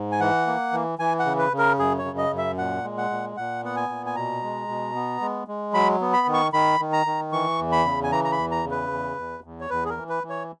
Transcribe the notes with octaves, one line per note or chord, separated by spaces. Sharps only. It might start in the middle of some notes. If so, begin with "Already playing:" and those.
Already playing: G#2
G#5
E3 F#5
A#3
E3
E3 G#5
F#5
C#3
B4
C#3
A#4
F#2 G#4
C#5
C#3
D#5
F#2
E5
A#2 F#5
G#3
F#5
A#2
A#2 F#5
B3 F#5
G#5
A#2
G#5
B2 A#5
G#3
B2
B3
G#3
G#3
F#3 B5
B3
B5
D#3
C#6
D#3 B5
D#3
A#5
D#3
E3 C#6
E2
B5
C#3
G#5
E3 A#5
A#5
B5
E2
A#5
C#3
B4
E2
E2
E2
C#5
E2 B4
G#4
A#4
E3
B4
E3
C#5